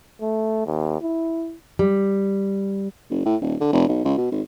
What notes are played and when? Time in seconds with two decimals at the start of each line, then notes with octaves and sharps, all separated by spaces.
0.22 A3
0.66 D#2
1.01 E4
1.79 G3
3.10 F#1
3.26 A2
3.41 D#1
3.61 D3
3.72 F1
3.88 B1
4.05 C#2
4.17 B2
4.32 G#1